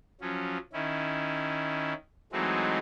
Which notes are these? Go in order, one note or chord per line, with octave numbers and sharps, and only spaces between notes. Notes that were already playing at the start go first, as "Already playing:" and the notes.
F3 F#3 C#4
D#3 C#4 E4
E3 F#3 G#3 A3 C4 D#4